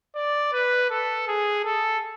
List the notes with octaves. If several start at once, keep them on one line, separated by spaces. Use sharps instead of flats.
D5
B4
A4
G#4
A4